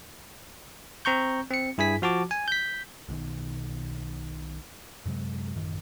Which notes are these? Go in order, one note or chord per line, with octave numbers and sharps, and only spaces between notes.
C4 A#5 C#6 G6
C4 C#7
G2 E4 G#4 G#5 B6
F3 F#4 A5 D6
G#5
G6 B6
B1 B2 D#3
F#2 C3 F#3 G#3
A1 F#2 D#3